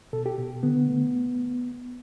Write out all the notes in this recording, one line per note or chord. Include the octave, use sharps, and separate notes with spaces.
B2 A4
G4
B2
D3 B3
A3